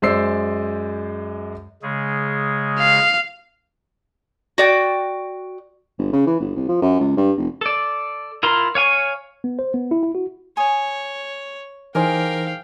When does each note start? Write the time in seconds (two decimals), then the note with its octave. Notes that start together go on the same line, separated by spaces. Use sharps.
0.02 F#2 G#3 C5 D5 E6 C7
1.83 C#3 G#3 G#4
2.79 F5
4.58 F#4 D5 G5
5.98 G1
6.13 C#3
6.27 E3
6.40 G1
6.56 C2
6.68 F3
6.82 F#2
7.00 C#2
7.17 G2
7.37 F1
7.61 A4 D5
8.43 E4 F4 A#4 A#5 C6
8.75 C#5 F5 G#5 C#6
9.44 B3
9.59 C5
9.74 B3
9.91 E4
10.03 E4
10.15 F#4
10.57 C#5 G#5 D#6
11.95 E3 D#4 G#4 A#4 C5 F5 G5 D6